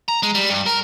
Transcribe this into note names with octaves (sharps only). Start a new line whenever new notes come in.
A#5
G#3
G3
G2
A#4